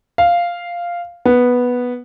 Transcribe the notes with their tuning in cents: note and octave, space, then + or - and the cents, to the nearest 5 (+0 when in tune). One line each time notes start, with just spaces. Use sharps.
F5 -5
B3 -5